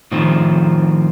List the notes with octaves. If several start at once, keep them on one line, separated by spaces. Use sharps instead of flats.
A2 D#3 F3 C4